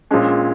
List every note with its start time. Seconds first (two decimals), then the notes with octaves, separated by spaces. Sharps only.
0.11 A#1 A#2 G#3 C#4